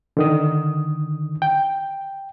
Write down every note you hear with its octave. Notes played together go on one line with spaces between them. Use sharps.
D3 D#3 D#6
G5